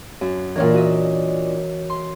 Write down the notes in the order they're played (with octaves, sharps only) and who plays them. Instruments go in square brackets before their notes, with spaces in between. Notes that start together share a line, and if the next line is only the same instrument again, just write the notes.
[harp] F#2
[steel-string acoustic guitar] A#2 D4 [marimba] E3 [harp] A#4 C#5 F5
[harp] F#4 D#5 E5
C6